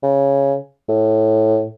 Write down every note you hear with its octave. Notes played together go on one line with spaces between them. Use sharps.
C#3
A2